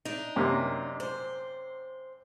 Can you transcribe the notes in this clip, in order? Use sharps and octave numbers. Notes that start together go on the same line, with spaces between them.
D4 D#4
F#2 C3 A#3
C5